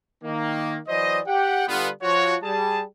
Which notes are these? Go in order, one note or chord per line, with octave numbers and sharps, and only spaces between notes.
D#3 A#3
E3 F#3 C5 D5 D#5
G4 F#5 G5
D3 G3 B3 F4
F3 F4 F#4 C#5
G3 G#4 A5